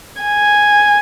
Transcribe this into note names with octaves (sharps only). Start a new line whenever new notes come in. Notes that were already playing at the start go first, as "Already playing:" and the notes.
G#5